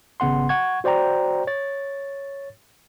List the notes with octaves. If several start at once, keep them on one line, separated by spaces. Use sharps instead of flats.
G#1 C#3 B3 F#5 C6
F#5 C#6 G#6
F#4 C5 D5 G5 A#5
C#5 A6